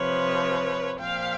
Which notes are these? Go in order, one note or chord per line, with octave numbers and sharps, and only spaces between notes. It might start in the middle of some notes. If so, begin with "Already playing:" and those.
Already playing: C3 F3 B4 C#5
A#2 F3 F5 G5